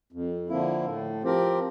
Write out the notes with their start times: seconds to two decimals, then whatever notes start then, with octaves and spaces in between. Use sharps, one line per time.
0.12 F2
0.49 D3 F3 A#3 E4
0.86 A2
1.22 F3 C4 G4 A#4